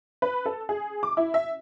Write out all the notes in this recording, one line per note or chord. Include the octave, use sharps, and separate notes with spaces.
B4
A4
G#4
D6
E4
E5